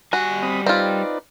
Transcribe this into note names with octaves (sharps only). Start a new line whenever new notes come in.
G3 F#4 G#5
C4 B5 D#6
C4 D#4 F4 B4 D5